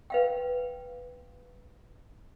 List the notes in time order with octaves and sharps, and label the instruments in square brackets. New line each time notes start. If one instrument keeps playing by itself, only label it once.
[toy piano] B4 F5 G5